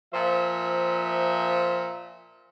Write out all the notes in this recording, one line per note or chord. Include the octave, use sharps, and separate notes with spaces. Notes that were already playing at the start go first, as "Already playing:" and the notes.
A#2 F3 C5 E5